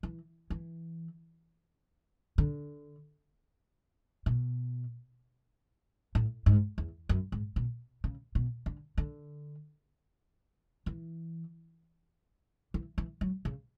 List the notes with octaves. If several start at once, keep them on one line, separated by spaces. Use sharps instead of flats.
E3
E3
D3
B2
A2
G#2
E2
F#2
G#2
B2
C#3
B2
D3
D3
E3
E3
E3
F#3
C#3